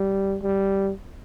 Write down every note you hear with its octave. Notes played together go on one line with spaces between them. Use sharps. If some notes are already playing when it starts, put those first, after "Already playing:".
Already playing: G3
G3